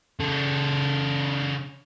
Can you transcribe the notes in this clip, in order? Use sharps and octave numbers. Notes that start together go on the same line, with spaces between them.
C#3 A4